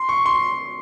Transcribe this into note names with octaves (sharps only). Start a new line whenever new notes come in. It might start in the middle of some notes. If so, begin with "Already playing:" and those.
Already playing: C6
C#6
C6